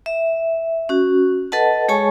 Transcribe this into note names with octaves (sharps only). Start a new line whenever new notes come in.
E5
C#4 F#4
A4 B4 D#5 F#5 A5
G#3 G#4 C#5 G#5 A5 C#6